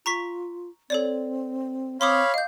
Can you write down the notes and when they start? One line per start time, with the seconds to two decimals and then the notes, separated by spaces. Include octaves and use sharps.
0.06 F4 A#5 C#6 B6
0.90 C4 A4 C#5 D5
2.01 C4 C#5 F5 B5 C6 D6 D#6
2.34 D#5 F5 G6